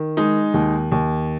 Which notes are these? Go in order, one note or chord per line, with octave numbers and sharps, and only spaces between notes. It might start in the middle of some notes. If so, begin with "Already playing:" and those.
Already playing: D#3
G#3 D#4
D#2
D#2